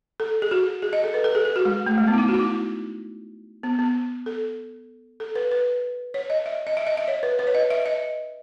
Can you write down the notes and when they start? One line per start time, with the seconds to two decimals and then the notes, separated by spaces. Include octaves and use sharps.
0.20 A4
0.42 G#4
0.51 F#4
0.82 G#4
0.93 D#5
1.04 A4
1.14 B4
1.24 A4
1.35 G#4
1.45 G#4
1.56 F#4
1.65 G#3
1.86 A3
1.98 G#3
2.08 B3
2.13 E4
2.18 D#4
2.28 F#4
2.34 E4
2.39 D#4
3.63 B3
3.79 B3
4.26 A4
5.20 A4
5.36 B4
5.51 B4
6.14 C#5
6.30 D#5
6.46 E5
6.67 D#5
6.77 E5
6.87 D#5
6.97 E5
7.08 C#5
7.23 B4
7.39 B4
7.47 C#5
7.55 D#5
7.70 E5
7.86 D#5